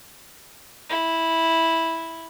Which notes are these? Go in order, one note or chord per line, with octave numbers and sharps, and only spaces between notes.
E4